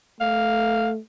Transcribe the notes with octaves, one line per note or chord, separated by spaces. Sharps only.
A3 F5